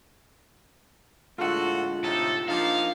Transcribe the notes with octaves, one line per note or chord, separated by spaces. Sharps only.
A2 D3 G#3 F4 F#4 A4 F#5
A2 C3 D#4 A4
F3 A#3 D4 D#4 A#4 F5